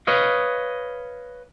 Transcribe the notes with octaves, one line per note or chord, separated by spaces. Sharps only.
B4 C#5 D#5 F5